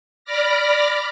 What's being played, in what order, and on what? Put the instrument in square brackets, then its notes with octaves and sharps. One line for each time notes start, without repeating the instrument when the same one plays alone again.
[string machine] D5 B5 D6 F6 A#6